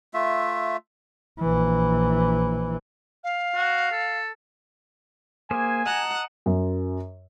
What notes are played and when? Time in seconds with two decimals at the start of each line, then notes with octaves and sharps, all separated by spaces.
0.14 A3 F4 E5
1.40 A#1 E3
3.24 F5
3.55 F#4
3.92 A4
5.51 A#3 G#4 C5 G#5
5.86 D#5 F#5 A5 A#5
6.46 F#2